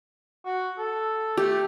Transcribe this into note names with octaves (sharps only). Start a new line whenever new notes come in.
F#4
A4
A3 G4